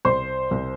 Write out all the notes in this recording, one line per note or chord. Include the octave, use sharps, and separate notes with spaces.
C2 C5 C6
C2